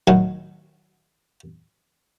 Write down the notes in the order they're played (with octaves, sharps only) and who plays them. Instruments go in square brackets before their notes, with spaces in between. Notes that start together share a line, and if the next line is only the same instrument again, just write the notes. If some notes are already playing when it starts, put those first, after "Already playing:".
[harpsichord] A2 D#3 F#3